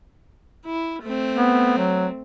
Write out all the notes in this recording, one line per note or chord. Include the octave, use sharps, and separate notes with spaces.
E4
A3 C4
B3
F#3